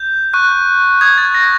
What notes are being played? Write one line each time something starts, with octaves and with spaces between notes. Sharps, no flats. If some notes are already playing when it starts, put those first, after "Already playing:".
Already playing: G6
C#6 F#6
D#6 G6 G#6
A6
A#6